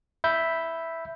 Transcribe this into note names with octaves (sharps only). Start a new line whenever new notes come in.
E5 B5 G6